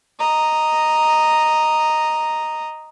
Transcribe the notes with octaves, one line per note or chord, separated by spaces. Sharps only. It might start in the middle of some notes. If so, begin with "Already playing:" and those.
D#5 A#5